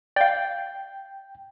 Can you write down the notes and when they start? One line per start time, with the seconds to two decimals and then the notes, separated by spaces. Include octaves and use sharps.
0.16 D5 F5 G5